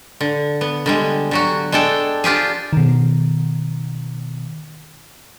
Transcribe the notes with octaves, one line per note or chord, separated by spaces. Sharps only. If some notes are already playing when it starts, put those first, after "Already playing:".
D3
B3
D3 G3 G#3
D3 F#3 F#4
G#3 D4 A4 G5
D4 F4 G4 G#4
B2 D#3